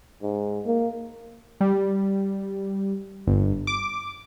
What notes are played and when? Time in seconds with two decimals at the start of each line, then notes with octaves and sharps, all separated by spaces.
0.23 G#2
0.66 A#3
1.61 G3
3.27 G1
3.67 D6